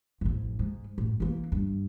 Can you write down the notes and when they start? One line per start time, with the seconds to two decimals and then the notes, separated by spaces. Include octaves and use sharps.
0.21 A1 F2
0.59 G#2
0.98 F#2 A2
1.20 E3 A#3
1.52 G2